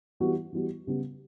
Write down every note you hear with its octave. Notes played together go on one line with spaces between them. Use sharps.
E3 G3 B3 F#4
E3 G3 B3 F#4
C#3 G3 B3